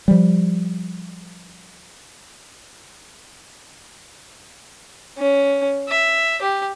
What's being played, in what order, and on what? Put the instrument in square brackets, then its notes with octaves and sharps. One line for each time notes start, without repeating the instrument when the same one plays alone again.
[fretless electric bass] F3 G3
[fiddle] C#4
E5
G4